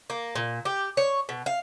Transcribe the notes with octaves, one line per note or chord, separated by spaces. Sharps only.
A#3
A#2
G4
C#5
B2
F5